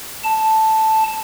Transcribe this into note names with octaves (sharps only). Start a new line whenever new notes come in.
A5